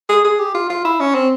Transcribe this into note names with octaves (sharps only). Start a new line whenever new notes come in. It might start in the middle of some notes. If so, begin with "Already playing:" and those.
G#4
G#4
G4
F4
F4
E4
C#4
C4